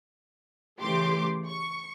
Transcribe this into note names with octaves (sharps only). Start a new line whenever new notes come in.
C#3 E3 A3 G4 C6 D6
C#6